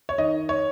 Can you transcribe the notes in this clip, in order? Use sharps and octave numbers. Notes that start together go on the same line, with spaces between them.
C#5
D#3 D#5
C#5